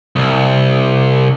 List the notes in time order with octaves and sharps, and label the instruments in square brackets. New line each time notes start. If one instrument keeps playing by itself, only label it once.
[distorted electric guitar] C2